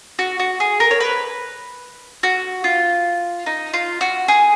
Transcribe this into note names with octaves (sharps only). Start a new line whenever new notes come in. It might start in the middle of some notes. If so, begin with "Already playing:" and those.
F#4
F#4
G#4
A#4
C#5
B4
F#4
F4
D#4
F4
F#4
G#4